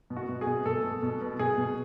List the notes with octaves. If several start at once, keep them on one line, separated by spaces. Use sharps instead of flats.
B2
F#4
B2
G#4
B2
B2 A4
B2
B2
B2
B2 G#4
B2